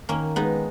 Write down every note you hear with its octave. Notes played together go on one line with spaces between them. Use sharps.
D#3 A#3 C#4
G#3 B3 D#4